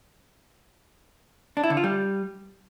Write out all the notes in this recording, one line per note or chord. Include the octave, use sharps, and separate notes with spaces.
D4
E4
D3
F4
G3